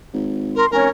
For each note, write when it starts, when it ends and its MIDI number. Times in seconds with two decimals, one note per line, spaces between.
0.14 0.63 32
0.56 0.66 70
0.56 0.68 84
0.71 0.87 29
0.71 0.87 61
0.71 0.89 70